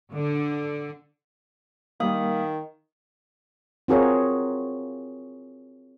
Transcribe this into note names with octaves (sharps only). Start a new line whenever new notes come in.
D3
D#3 G3 A#3 F5 D#6
C4 F4 F#4 G#4 A#4 C#5